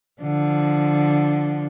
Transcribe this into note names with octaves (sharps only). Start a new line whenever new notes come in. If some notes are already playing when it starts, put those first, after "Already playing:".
D3 F3